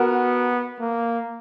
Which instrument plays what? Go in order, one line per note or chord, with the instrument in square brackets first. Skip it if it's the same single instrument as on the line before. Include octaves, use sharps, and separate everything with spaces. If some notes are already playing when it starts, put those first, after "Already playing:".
Already playing: [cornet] B3 [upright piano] F#4 A#4
[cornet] A#3